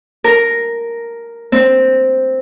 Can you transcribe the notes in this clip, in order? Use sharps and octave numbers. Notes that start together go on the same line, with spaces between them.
A#4
C4